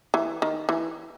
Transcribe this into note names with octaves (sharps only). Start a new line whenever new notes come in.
E3
D#3
E3